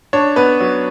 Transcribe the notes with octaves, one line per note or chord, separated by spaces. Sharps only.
D4 C#5
B3 B4
F#3